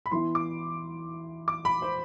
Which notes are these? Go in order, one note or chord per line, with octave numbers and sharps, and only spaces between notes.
B5
E3 B3 E4 C6
D6
D6
B5
C5